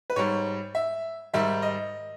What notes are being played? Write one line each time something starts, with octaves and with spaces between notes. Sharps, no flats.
B4
G#2 G3 C#5
E5
G#2 D#3 G3 E5
D#5